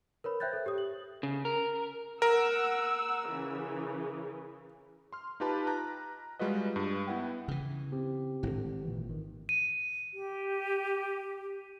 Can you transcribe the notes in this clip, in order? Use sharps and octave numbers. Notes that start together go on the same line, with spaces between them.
A#4 B4 C#5 B5
C5 E5 G5 F#6 G6 A6
A4
G4 C#5 D#6
F#7
C#3
A#4
A#4 F#5 E6
C#3 E3
C6 F6
D#4 F4 G4 B4 A5 B5
A#5 F#6
G3 G#3 F4 F#4 B4 D#5
G2
B3 E4 B4 F#5 G5
C#3 E3
C4 G4
G#1 A2 D3
A#2 E3
D#3
D#7
G4